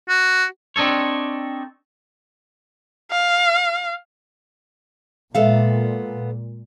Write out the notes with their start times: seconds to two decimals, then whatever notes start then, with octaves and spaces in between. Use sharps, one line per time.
0.09 F#4
0.76 C4 D4 D#4 A4 C#5
3.11 F5
5.35 A#2 G#3 B3 A4 E5 F5